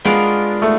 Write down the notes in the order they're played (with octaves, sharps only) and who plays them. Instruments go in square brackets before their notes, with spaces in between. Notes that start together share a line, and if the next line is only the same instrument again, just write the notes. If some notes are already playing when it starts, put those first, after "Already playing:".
[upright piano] G#3 [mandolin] B3 D4 F4 A#4
[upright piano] A3